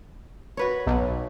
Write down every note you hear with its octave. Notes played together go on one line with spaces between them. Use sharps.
F#4 B4 C#5
B1